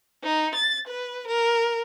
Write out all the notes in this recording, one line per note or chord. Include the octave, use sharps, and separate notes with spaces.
D#4
A6
B4
A#4